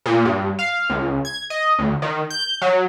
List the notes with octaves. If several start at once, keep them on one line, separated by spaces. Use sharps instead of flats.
A#2
G2
F5
C#2
G#6
D#5
D2
D#3
G6
F#3